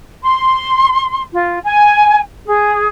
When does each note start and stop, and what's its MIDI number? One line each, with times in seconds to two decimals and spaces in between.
0.23 1.22 84
1.33 1.58 65
1.64 2.20 80
2.46 2.87 68